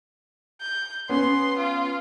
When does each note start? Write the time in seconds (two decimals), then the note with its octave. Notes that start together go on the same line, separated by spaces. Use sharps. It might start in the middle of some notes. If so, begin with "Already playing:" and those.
0.61 G6
1.09 B3 C#4 C6
1.58 F4